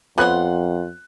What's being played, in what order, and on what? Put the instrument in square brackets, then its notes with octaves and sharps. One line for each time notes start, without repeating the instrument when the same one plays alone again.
[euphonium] F2 [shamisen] B3 B4 C#5 [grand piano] F4 F#6 [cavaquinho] F#5 C6